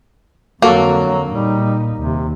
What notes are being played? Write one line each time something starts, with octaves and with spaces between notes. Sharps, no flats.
F2 D3 F#3 A#3 F#4 A4 C#6
A#2 G3 D#4
D#2 C3